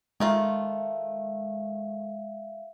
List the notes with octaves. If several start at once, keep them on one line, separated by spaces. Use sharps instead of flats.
D#3 G#3 A3 F4 E5 F5